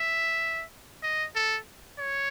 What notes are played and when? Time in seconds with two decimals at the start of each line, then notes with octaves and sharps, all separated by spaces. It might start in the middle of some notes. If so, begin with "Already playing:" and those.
Already playing: E5
1.03 D#5
1.35 A4
1.99 C#5